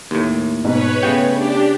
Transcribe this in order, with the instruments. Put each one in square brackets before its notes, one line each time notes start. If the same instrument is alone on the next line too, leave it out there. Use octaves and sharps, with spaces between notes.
[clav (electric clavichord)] D#2 A2
[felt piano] G#2 B2 [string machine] B4 C#5
[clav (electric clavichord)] C#3 G5 [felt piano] A3 B3
[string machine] D4 G4